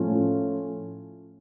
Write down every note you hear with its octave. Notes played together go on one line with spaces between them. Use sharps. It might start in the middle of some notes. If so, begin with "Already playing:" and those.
Already playing: A2 F3 A3 C#4 F4